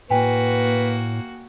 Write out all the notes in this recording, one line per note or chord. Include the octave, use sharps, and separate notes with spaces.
A2 A#3 F#4 B4 G5 G#5